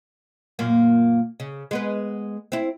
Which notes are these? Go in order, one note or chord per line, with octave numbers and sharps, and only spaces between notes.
F#2 A#2 A#3
C#3
G#3 B3 B4
C4 E4